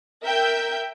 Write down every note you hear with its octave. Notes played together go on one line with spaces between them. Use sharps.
A#4 E5 G5 G6